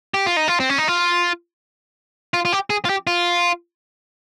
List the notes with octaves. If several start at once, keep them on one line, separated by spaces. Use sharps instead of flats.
G4
F4
D#4
F4
C4
C#4
D#4
F4
F4
F4
G4
G#4
F4
G4
F4